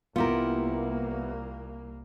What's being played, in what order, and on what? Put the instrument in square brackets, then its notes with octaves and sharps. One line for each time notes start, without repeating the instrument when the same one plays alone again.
[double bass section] C2 A#3 [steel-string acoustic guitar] B3 E4 [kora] F4 G4 A#4